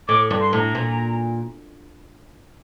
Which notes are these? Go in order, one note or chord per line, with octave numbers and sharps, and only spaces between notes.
A2 D6
G2
C6
A2 A#5
A#2